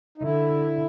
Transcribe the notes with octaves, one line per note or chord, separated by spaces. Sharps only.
D#4
D3 E4